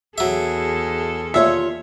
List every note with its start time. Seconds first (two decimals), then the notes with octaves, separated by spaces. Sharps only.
0.18 E2 F#3 G#4 A4 E5
1.34 D#2 F4 C#5 E5